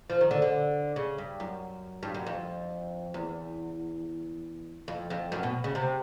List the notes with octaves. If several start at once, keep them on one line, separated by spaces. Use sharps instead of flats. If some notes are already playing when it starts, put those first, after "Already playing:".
F3
D#3
D3
D3
C#3
G2
F#2
G2
F#2
F2
E2
F2
F2
F#2
B2
C#3
C3